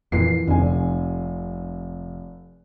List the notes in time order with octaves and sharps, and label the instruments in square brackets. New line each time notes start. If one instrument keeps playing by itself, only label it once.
[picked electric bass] F2 A#2 E3 [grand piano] C7
[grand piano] F1 C3 G#5 [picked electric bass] F2